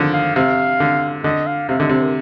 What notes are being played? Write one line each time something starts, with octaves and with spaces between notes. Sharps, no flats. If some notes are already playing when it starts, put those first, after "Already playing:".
Already playing: D3 D#3 F3
F5
C3 F5
D3
D3 D#5
F5
C3 F5
D3 D#5
C3 C5
A#4